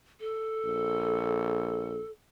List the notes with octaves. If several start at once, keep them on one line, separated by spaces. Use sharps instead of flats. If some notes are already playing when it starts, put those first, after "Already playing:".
A4
A#1